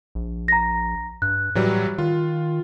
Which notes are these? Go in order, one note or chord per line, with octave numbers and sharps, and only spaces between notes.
A#1
A#5 A#6
G2 F#6
A2 E3 F#3 G3
D#3 F4